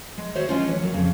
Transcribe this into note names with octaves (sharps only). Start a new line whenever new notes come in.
G#3
D#3 F#4 C5 C#5 E5
G#3 C#4 D4 F4 C5
E3 B4 C#5
D2 F#3 A#4
F2 A#2 C#3